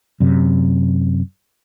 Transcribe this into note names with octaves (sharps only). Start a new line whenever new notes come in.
F#2 C3